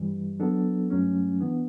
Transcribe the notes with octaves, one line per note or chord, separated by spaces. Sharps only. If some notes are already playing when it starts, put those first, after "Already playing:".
Already playing: G2 E3 G3
F#3 B3 D4 A4
G2 F#3 A3 C#4
E3 B3 D4